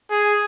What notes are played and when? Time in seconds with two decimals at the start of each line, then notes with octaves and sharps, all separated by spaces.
0.11 G#4